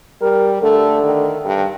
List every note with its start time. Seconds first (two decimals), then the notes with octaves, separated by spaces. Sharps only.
0.21 G3 A#4
0.62 D3 A3
1.03 D#3
1.45 G2